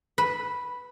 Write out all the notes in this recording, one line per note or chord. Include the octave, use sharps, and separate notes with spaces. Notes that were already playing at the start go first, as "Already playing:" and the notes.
B4